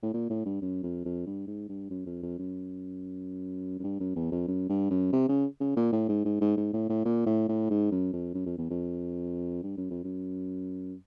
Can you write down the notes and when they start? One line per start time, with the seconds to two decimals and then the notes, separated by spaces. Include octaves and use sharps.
0.03 A2
0.14 A#2
0.30 A2
0.46 G2
0.62 F#2
0.83 F2
1.05 F2
1.26 G2
1.47 G#2
1.69 G2
1.90 F#2
2.07 F2
2.23 F2
2.39 F#2
3.79 F#2
3.84 G2
4.00 F#2
4.16 E2
4.32 F2
4.48 F#2
4.69 G2
4.91 F#2
5.13 C3
5.29 C#3
5.61 C#3
5.76 A#2
5.93 A2
6.09 G#2
6.25 G#2
6.41 G#2
6.57 G#2
6.73 A2
6.89 A2
7.05 A#2
7.26 A2
7.49 A2
7.70 G#2
7.92 F#2
8.13 F2
8.34 F#2
8.46 F2
8.58 E2
8.71 F2
9.63 G2
9.77 F#2
9.91 F2
10.04 F#2